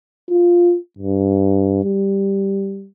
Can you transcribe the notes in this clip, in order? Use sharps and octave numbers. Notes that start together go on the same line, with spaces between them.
F4
G2
G3